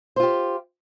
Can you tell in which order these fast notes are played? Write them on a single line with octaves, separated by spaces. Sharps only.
C5 F4 G4